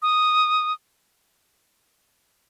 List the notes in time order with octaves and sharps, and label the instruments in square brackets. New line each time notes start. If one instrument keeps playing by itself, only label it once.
[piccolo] D#6